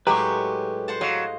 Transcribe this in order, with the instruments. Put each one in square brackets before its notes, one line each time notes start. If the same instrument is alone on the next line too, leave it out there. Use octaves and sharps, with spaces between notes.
[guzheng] A2 F#3 G#3 [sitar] G4 [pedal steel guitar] B4 C#6 [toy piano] A#5
[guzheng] C5 F#5 A5
[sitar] F#3 [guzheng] D#5 F5